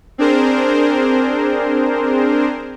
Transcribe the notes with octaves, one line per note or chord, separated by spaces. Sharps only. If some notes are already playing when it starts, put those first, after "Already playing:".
C4 D4 G#4 A#4 C5